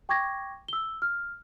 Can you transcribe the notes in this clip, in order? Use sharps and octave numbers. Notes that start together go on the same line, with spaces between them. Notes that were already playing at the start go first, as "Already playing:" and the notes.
G5 C#6 D6 G#6 A#6
E6 G7
F6